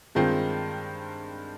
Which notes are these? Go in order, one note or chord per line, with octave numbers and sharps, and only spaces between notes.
G2 D#3 G#3 C4 F4